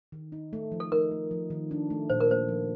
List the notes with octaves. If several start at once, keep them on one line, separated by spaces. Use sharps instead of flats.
D#3
D#4
A3
F3
A4
D#4 A#4
A3
F3
D#3
D4
A3
A#2 C5
A#4
A#3 C5
F3